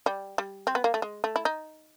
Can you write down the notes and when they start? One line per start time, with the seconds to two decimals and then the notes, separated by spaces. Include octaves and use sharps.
0.06 G3
0.38 G3
0.67 C4
0.75 B3
0.84 A#3
0.94 A3
1.02 G#3
1.24 A3
1.36 E4
1.45 D#4